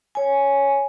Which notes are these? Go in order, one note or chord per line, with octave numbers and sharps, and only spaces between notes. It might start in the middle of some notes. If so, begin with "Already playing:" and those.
C#5 G#5